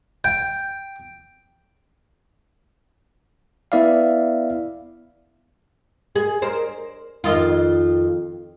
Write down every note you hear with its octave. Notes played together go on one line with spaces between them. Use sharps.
G5
B3 E4 D5 E5 F5
G#4
A#4 C5
F2 D#3 F4